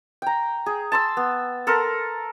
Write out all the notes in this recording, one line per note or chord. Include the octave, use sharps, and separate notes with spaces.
G5 A#5
G#4
A5 C6 E6
B3
A4 A#4 A5 C6